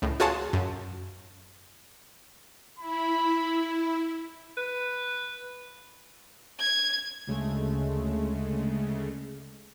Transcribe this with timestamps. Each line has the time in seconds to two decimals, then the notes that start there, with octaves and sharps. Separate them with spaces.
0.02 C#2 A2
0.20 F4 F#4 G#4 C#5 A5 C6
0.53 F#2
2.79 E4 B5
4.57 B4
6.60 G#6
7.27 D2 C#3 G#3 A3